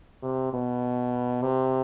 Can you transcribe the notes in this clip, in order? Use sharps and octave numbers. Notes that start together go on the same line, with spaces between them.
C3
B2
C3